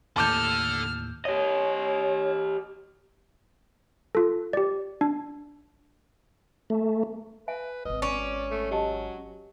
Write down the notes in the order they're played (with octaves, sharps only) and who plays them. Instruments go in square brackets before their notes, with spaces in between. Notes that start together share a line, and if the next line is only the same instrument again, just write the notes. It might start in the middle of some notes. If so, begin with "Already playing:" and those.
[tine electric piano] D#2 A2 [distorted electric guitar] D3 A4 [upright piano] A5 D6 G6 [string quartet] F6
[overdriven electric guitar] G4 D#5 [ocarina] C#5
[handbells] F4 A4
G4 D5
D4
[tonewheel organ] A3
[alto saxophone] B4 [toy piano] E5 G#5
[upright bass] G#1 G#3 [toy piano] B4 [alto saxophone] D#5
[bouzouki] C#4 [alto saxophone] D5
[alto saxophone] A3
[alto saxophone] F#3 [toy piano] G4 D#5 A5